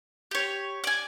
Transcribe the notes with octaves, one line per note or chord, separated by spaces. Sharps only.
G4 C#5
D5 G#5